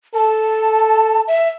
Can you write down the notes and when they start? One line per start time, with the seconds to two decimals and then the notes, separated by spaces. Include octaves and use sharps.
0.15 A4 A5
1.28 E5